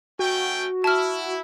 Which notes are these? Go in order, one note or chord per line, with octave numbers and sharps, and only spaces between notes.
A3 C#4 F#4 G5
E4 A5 F6